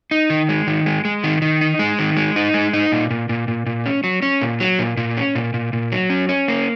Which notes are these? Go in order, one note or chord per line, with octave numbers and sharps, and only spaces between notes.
D#4
D#3
G#3
D#3
G#3
G#3
D#3
D#3
D#4
G#3
D#3
G#3
D#4
G#3
D#4
A#2
A#2
A#2
A#2
A#2
C#4
F#3
C#4
A#2
F#3
A#2
A#2
C#4
A#2
A#2
A#2
F#3
C#4
C#4
A#3